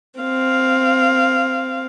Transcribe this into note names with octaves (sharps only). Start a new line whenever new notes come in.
C4 F5